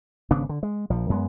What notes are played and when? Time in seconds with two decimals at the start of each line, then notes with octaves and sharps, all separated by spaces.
0.31 G#1 C#3 B3 D4
0.49 D3
0.63 G#3
0.90 A#1 F3
1.09 F#2 G#3 B3